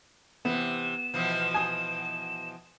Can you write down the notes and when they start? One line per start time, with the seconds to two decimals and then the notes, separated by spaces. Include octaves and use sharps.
0.45 C3 E3 B3 E7
1.14 B2 E3 F3
1.54 G#5 D#6